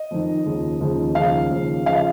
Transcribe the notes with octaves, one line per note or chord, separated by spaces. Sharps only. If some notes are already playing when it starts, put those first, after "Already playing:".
Already playing: D#5
F2 D#3
D#2 C#3 F3
D#2 C#3 F3
D#2 C#3 F3 F5
D#2 C#3 F3
C#3 F3 F5
F5